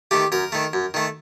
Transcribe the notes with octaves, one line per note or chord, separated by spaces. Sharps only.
D#3 A3 G4
F#2 A#4
D#3 A3
F#2
D#3 A3